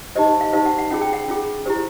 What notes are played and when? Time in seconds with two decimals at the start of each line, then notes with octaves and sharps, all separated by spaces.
0.15 D#4 G4 C5 D#5
0.41 F5
0.53 D#4 G4 C5 F5
0.66 F#5
0.78 F#5
0.91 C#4 F4 G#4 F#5
1.01 G5
1.13 F#5
1.28 C#4 F4 G#4
1.66 E4 G4 C5